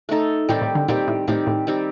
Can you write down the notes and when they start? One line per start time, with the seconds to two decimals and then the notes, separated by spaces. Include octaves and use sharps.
0.09 A3 D#4 A4
0.49 A2 D#3 G3 C4 G4
0.62 A2
0.75 D3
0.88 A#2 D#3 G3 C4 G4
1.08 A2
1.28 A2 D#3 G3 C4 G4
1.47 A2
1.67 D#3 G3 C4 G4